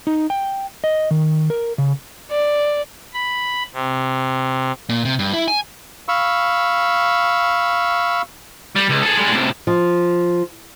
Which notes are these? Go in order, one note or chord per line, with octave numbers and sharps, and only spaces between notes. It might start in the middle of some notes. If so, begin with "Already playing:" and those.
D#4
G5
D#5
D#3
A#4
C#3
D5
B5
C3
A#2
C3
G2
E4
G#5
F5 B5 C#6 E6
G3
C#2
G#4 A4
G3 G#3
A2 C3
F3